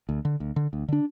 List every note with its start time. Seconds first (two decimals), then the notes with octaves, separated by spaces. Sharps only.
0.09 D2
0.25 D3
0.40 D2
0.56 D3
0.73 D2
0.89 D3 D4